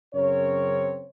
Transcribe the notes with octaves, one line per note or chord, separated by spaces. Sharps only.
F#2 C#3 C4 A#4 C#5